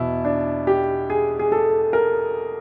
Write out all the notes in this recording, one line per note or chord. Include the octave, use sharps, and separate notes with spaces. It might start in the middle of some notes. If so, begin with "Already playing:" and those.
Already playing: E2 B2 E4
D4
G4
G#4
G#4
A4
A#4